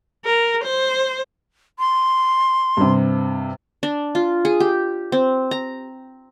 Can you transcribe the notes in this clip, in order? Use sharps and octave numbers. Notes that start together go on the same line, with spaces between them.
A#4
C5
C6
G2 C3
D4
F4
G#4
G4
C4
A#5